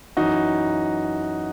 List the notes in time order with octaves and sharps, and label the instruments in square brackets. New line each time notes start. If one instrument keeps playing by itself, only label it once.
[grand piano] F#2 E3 D#4 F#4